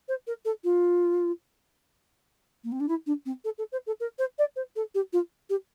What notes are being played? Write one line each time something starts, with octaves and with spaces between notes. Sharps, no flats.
C5
A#4
A4
F4
A#3
C4
D4
E4
D4
C4
A4
A4
C5
A4
A#4
C5
D5
C5
A4
G4
F4
G4